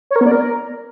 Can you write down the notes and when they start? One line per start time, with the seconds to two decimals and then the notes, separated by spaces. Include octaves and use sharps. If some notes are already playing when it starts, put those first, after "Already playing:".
0.11 C#5
0.16 A#4
0.21 B3
0.26 D5
0.31 A#4